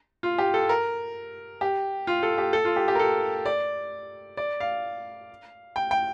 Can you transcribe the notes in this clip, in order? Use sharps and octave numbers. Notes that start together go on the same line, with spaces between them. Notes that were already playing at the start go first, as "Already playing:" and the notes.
F4
G4
A4
A#4
G4
F4
A4
G4
A4
F4
G4
G4
A#4
A4
D5
D5
F5
G5
G5